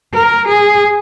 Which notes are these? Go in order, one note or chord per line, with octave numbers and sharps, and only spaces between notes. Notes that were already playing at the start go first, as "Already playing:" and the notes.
A#4
G#4